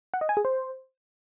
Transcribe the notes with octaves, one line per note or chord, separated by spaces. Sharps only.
F#5
D#5
G#5
G#4
C5